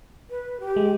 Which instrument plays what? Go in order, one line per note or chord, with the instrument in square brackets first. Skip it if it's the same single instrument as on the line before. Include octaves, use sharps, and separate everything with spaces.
[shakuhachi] B4
G4
[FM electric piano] G#3